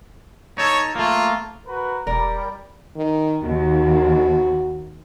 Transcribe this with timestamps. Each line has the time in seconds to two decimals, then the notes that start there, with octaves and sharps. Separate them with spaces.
0.58 D#4 A4 C#5
0.95 A3 A#3 F4
1.66 F#4 A#4 B4
2.07 E1 G3 A#4 D5
2.96 D#3
3.44 D#2 F#4